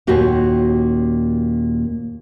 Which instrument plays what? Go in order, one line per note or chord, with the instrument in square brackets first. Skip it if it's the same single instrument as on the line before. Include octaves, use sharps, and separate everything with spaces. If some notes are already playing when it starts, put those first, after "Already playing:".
[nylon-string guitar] D#2 A#2 C#4 D#4 F#4 G4